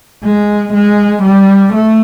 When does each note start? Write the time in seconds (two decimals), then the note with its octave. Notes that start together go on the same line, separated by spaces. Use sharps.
0.24 G#3
0.74 G#3
1.23 G3
1.73 A3